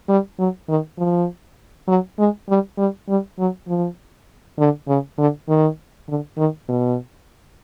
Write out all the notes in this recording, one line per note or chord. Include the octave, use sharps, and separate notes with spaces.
G3
F#3
D#3
F3
F#3
G#3
G3
G3
G3
F#3
F3
D3
C#3
D3
D#3
D3
D#3
B2